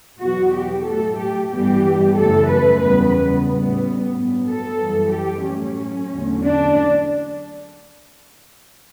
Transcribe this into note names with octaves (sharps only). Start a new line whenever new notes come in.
E2 B2 F#3 B3 F#4
G4
A2 F#3 A3 A4
G4
G2 E3 G3 B3 G4
F#2 C#3 E3 A3 A4
B4
E2 C#3 G3 B3 B4
A2 G3 B3
G2 F#3 B3
A4
F#2 E3 G3
G4
A2 F#3 A3 C#4
E2 D3 F#3 A3
D4